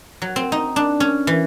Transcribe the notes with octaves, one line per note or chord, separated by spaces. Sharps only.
F#3
C4
D#4
D4
C#4
E3